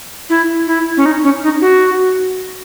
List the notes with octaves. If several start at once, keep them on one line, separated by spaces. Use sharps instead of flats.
E4
E4
C#4
D#4
C#4
D#4
F#4